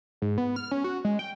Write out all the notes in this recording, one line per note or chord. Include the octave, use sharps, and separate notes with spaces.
G#2
B3
F6
C#4
F#4
G#3
G5